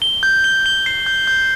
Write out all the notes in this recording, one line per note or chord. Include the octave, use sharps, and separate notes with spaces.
G7
G6
G7
G7
C7
G6
G6